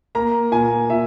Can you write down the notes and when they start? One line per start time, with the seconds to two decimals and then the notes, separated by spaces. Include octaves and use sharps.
0.15 A#3 A#5
0.51 A#2 G#5
0.89 A#2 E5